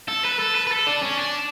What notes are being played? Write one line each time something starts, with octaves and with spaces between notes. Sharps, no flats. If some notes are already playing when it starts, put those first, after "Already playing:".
A4
B4
A4
B4
B4
A4
D4
C#4
D4